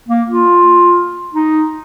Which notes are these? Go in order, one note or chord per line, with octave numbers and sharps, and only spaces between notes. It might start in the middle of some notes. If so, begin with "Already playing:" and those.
A#3
F4
D#4